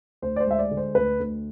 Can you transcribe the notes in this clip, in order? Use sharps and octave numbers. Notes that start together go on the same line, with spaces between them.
D2 C5
D5
C5
G#3 E5
D5
D3
C5
D2 B4
D2